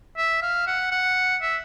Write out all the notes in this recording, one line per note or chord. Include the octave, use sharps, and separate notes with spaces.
E5
F5
F#5
F#5
E5